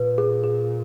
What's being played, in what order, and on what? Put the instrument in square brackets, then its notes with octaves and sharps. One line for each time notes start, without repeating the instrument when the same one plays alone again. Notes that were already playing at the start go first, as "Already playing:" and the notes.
Already playing: [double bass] A#2 [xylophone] B4
[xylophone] G#4
G#4